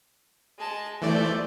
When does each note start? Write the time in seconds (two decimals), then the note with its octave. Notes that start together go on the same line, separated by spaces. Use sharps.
0.58 G#3 A5
1.02 E3 A3 G4 C5 D5